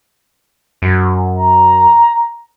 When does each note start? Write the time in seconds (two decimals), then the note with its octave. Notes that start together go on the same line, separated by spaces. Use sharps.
0.82 F#2
1.38 A#5